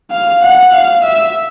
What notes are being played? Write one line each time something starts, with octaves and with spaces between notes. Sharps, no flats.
F5
F#5
F5
E5